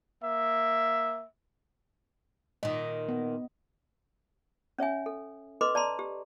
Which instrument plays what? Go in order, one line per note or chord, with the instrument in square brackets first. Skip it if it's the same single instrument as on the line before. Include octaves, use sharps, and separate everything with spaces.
[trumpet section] A#3 E5
[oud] A#2 D#3 [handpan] D#5
[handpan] B3
[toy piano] C#4 C#5 E5 G#5
A4
A4 B4 D#5 C6 D6
D5 A5 A#5 C6
G4